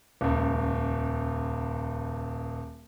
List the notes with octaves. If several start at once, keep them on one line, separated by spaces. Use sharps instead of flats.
D#1 C#2